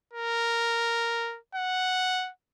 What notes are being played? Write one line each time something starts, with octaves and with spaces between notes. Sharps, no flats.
A#4
F#5